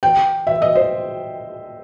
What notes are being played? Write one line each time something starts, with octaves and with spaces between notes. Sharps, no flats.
G5
E5
D#5
C5